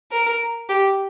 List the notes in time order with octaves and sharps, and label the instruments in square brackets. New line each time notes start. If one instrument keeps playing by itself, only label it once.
[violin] A#4
G4